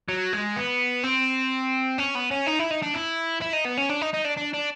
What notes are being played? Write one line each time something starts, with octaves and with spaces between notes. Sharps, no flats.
F#3
G#3
B3
C4
C#4
B3
C#4
D#4
E4
D#4
D4
E4
E4
D#4
B3
C#4
D4
D#4
D#4
D4
D4
D4